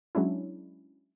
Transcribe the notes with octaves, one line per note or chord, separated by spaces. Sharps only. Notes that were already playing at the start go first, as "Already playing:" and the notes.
F#3 G#3 C#4 D4 E4